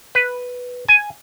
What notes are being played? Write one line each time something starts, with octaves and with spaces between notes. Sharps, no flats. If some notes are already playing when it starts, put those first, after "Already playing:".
B4
G#5